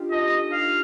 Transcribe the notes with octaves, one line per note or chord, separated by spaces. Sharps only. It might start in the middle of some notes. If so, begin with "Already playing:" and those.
Already playing: D4 D#4 F4 G4
A4 D#5
F5